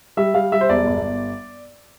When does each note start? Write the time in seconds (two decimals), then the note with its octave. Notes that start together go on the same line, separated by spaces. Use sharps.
0.17 G3 E5
0.34 G3 F5
0.52 G3 E5
0.61 C5
0.69 E1 D5
0.86 G1